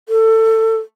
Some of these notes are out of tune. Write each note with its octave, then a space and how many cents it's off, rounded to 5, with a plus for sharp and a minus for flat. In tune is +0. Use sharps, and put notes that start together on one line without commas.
A4 +20